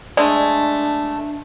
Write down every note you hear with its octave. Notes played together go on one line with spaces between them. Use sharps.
G#3 A3 D4 D5